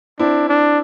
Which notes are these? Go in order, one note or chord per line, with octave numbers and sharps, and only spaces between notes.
C4 D4 E4
D4